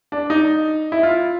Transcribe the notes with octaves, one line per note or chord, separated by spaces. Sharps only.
D4
D#4
E4
F4